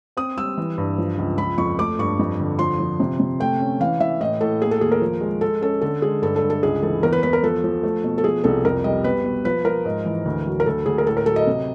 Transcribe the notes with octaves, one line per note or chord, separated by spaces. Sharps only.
C4 D#6
G3 E6
E3
G2
F3
C#2
F3 B5
F2 C#6
A3 D6
G2 C#6
F2
D3
F3 C6
F3
C3
C3
A3 G5
C#4
E3 F5
E3 E5
A2 D#5
A2 A4
A#3 G#4
A4
D#2 G#4
A#4
F3
G#3
G#3 A4
C#4 A4
D3 A4
G#3 G#4
G2 A4
A4
G2
A4
C#2 G#4
E3 A4
E2 A#4
B4
E2 B4
A#4
F3 A4
F3
A3
B2
A4
F3 G#4
C2 A4
F2 A#4
G3 D#5
B2 B4
B2
F3 B4
F3 A#4
G#2
E3
D2
F#3
A#4
D2 A4
D2 G#4
A#4
A2 A4
A#4
F#3 A4
D#5
C3